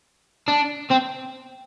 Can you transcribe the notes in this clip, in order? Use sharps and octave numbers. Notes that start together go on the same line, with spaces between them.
D4
C4